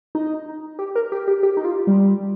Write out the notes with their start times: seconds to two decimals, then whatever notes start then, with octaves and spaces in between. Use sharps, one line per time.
0.15 D#4
0.79 G4
0.95 A#4
1.12 G4
1.28 G4
1.43 G4
1.57 D#4
1.65 F4
1.87 G3